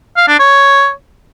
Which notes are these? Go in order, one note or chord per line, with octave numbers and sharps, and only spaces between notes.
F5
D4
C#5